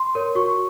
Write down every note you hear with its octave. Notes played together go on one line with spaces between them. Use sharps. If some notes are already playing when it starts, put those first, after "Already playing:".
Already playing: C6
A#4 C#5
F#4 C#6